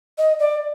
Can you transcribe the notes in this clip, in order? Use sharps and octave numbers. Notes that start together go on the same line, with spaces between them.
D#5
D5